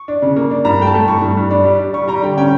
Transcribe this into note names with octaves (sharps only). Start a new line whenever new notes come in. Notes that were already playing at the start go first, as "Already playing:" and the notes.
Already playing: C#6
D4
C#3
A#3
D4
G2 A#5
A3 G5
A5
A3
G2 C#6
G2
G2
D4
G3
D4
G3 C#6
G3 A#5
D3 G5
C#4 G5